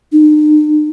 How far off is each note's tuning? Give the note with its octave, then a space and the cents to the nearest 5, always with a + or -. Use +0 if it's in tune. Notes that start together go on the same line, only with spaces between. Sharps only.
D#4 -45